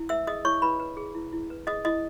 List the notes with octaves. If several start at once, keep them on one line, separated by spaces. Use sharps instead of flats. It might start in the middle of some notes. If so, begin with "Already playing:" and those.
Already playing: E4
B4 E5 E6
G#4 D#5 D#6
E4 C#5 C#6
E4 B4 B5
B4
G#4
E4
E4
B4
G#4 D#5 D#6
E4 D#5 D#6